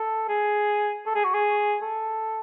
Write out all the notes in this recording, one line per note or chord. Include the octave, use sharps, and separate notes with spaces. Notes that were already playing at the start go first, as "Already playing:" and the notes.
Already playing: A4
G#4
A4
G#4
F#4
G#4
A4